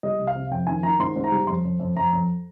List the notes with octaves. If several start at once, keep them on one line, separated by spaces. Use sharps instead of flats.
G3 D#5
C2
F5
C3
F2 G5
D#3 G#5
D#3 A#5
G#2 C6
G#2
A#5
G3
F2 C6
F2
F2
F2 A#5
F2